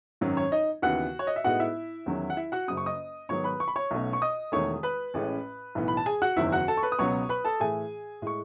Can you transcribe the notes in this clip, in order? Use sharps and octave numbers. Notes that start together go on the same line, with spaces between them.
G#1 F#2 D#3 F#3 C#4
C#5
D#4 D#5
D#2 C#3 E3 B3 E4 F#4 F#5
C#5
D#5
E5
A2 G#3 B3 D#4 F#4 F#5
E4 E5
E2 D#3 F#3 C#4
F#5
E4 E5
F#4 F#5
F#1 F#2 C#3 D#6
C#6
D#5 D#6
G#2 D#3 F#3 B3 C#5 C#6
B4 B5
C#6
B5
C#5 C#6
B1 B2 A3 C#4
C#6
D#5 D#6
E1 E2 D#3 A3 C#5 C#6
B4 B5
A1 A2 G#3 C#4
B1 A2 E3 B3
B5
A5
G#4 G#5
F#4 F#5
F#1 E2 D#3 F#3 E4 E5
F#4 F#5
A4 A5
C#6
B4 B5
D#6
C#2 B2 F#3 B3 C#5 C#6
B4 B5
A4 A5
A2 E3 A3 G#4 G#5
A2 G#3 C#6